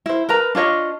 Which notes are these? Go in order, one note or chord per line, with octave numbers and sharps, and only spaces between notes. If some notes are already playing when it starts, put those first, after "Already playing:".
E4 C5
A#4 B4 A#5
D4 F4 C#5 D#5